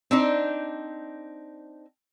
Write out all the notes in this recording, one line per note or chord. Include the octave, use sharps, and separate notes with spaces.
C4 D4 D#4